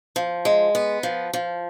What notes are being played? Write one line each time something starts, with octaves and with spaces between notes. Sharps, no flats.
F3
G#3
B3
F3
F3